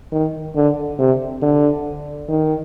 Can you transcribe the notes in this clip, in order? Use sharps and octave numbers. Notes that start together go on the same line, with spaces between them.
D#3
D3
C3
D3
D#3